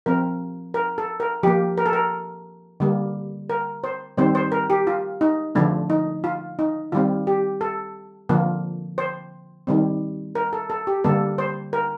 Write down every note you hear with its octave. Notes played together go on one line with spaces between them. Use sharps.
F3 C4 A#4
A#4
A4
A#4
F3 A#3 G4
A#4
A4
A#4
D3 G3 A#3
A#4
C5
D#3 G3 C4 C5
C5
A#4
G4
F4
D#4
D3 F3 A3 D4
D#4
F4
D#4
D#3 G3 C4 F4
G4
A4
D3 F3 A#3
C5
D#3 G3 C4
A#4
A4
A4
G4
D3 G3 A#3 A4
C5
A#4